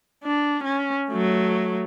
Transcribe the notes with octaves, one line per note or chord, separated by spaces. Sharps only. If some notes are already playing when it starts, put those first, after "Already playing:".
D4
C#4
F#3 A3